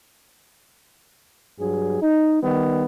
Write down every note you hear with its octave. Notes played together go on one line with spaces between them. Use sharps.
G2 F#3 G#4
D#4
D#3 G3 B3